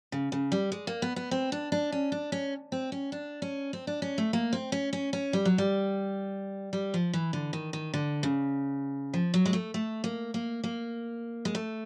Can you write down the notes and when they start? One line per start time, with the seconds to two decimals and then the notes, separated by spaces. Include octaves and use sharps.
0.12 C#3
0.32 C#3
0.52 G3
0.72 G#3
0.87 A#3
1.02 B3
1.16 B3
1.31 C4
1.52 D4
1.72 D4
1.92 C#4
2.12 D4
2.32 C#4
2.72 C4
2.92 C#4
3.12 D4
3.42 C#4
3.73 C4
3.87 D4
4.02 C#4
4.18 A3
4.33 A#3
4.53 C4
4.72 C#4
4.93 C#4
5.13 C#4
5.33 G3
5.45 F#3
5.58 G3
6.73 G3
6.94 F3
7.13 E3
7.33 D3
7.53 D#3
7.73 D#3
7.94 D3
8.23 C#3
9.14 F3
9.34 F#3
9.46 G#3
9.53 A3
9.74 A3
10.04 A#3
10.34 A#3
10.64 A#3
11.45 G#3
11.55 A3